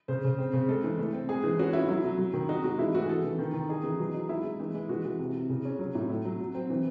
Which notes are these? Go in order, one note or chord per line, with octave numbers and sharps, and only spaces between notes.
C#3 C5
C#3
C4
C#3
G#3 A4
E3
A3
C4
G#3 G#4
E3
C#4 F#4
C#4 E4
F#3 E4
F#3
F#3
D#3
D#4 F#4
G#3 F#4
E3 E4
A3 F#4
G#4
E3 A4
E3
D#3
D#3
D#4 G#4
E3
F#3
D#4
G#3 E4
G#3
E3
G#3
E3 F#4
E3
C3
C3
C#3
C#4
F#3
A2
A3
F#3
F#3
C4
E3